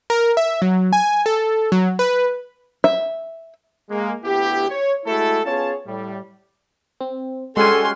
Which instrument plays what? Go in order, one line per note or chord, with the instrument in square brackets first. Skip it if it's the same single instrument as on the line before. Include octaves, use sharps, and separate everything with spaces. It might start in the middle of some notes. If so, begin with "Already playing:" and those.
[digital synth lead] A#4
E5
F#3
G#5
A4
F#3
B4
[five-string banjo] E5
[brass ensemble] G#3 A#3
D2 B3 E4 G4
C#5
G#3 A3 E4 F#4 A4
B3 C#4 F4 G#4 C#5 A5
A2 G3
[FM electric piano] C4
[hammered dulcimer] G3 C#4 F#4 [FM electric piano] G#3 G#5 [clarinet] A4 [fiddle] C6